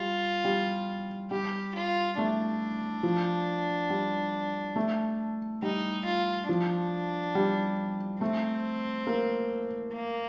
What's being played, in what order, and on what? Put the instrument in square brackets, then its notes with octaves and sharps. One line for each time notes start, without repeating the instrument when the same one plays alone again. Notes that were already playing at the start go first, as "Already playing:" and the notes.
Already playing: [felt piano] G3 [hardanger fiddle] F4
[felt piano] G3
[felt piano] G3 [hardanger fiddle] G4
[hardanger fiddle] F4
[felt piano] A3 [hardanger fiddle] D4
[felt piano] F3
G3
A3
[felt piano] G3 [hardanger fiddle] D#4
[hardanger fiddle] F4
[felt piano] F3 [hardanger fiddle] D4
[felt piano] G3
[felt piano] A3 [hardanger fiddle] C4
[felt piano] A#3
[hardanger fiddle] A#3